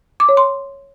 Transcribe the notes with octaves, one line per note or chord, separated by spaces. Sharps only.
D6
C#5
C6